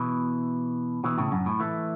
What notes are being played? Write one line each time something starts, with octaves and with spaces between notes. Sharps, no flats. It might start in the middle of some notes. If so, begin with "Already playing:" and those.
Already playing: B2 E3
B2 E3
A2 C#3
F#2
A2
E3 A3